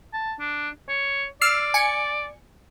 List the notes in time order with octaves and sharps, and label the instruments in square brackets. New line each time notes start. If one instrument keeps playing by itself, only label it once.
[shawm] A5
D4
C#5
[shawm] D5 [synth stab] E6 F6 C7
[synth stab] G#5 C#7